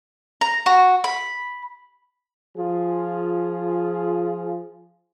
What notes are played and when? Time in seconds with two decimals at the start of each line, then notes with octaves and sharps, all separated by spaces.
0.41 A#5
0.66 F#4
1.04 B5
2.56 F3 F4 G#4